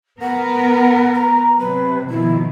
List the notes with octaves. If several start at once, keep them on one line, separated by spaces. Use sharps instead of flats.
B3 A#4 B4 F#5
A#5
C3 F#3 B4
B2 D#3 F3 E4